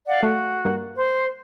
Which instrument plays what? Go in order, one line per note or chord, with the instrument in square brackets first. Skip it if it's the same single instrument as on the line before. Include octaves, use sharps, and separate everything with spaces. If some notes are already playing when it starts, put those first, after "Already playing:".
[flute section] D5 F5 F#5
[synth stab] A3 [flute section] F#4
[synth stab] G2 A#3
[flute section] C5